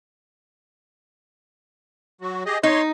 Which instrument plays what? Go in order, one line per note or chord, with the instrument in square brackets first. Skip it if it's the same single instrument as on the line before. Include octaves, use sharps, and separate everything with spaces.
[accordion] F#3 F#4
G4 G#4 D#5
[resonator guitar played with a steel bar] D#4 [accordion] C#5 C6